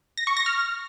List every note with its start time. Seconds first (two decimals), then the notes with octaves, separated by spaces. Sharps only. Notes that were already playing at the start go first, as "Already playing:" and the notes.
0.17 A#6
0.27 C#6
0.37 A#6
0.46 F6